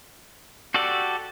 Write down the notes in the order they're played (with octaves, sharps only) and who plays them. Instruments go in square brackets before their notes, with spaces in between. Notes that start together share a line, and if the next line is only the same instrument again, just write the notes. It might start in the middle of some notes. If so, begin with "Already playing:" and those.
[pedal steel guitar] F#4 G4 A4 D5